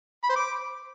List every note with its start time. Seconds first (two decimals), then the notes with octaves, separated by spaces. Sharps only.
0.23 B5
0.30 C5
0.36 D6